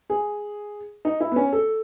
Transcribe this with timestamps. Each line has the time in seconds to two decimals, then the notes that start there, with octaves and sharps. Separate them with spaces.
0.10 G#4
1.05 D#4
1.20 E4
1.32 B3
1.36 C#4
1.53 A4